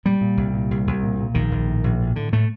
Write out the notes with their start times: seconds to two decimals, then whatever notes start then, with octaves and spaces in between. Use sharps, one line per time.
0.05 A#2 G3
0.21 A#2
0.37 C2
0.54 A#2
0.71 C2
0.87 C2
1.03 A#2
1.19 A#2
1.35 A#1 D#3
1.51 A#1
1.67 A2
1.84 A#1
2.00 A2
2.16 A2 D3
2.32 A2 A3